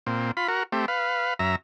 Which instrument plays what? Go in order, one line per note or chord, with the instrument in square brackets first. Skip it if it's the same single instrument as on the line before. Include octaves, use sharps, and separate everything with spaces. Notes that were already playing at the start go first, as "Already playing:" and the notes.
[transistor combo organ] A#2 C4
F4 B5
F#4 A#4
A3 C4 G4
B4 F5
F#2 E5 A#5